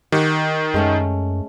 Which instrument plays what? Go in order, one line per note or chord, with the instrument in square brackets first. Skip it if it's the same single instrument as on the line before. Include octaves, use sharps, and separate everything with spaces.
[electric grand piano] D#3 [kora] G4 F#5
[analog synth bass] F#2 [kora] G#3 A3 C#4